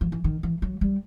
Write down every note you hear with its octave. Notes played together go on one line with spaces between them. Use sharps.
F3
E3
D#3
E3
F#3
G3